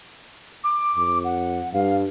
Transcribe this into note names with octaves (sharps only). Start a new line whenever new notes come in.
D6
F2
F#5
G2 F5